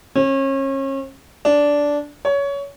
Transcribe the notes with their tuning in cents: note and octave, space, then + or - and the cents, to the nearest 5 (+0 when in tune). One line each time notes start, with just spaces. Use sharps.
C#4 -35
D4 -10
C#5 +20